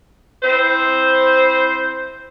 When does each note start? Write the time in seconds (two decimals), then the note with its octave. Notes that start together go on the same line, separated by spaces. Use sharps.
0.43 C4 E4 C5